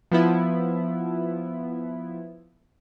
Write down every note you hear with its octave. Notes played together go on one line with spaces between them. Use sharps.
F3 B3 E4